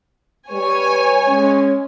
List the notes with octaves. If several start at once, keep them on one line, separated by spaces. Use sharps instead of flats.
G3 B4 C#5 G#5
G#3 C#4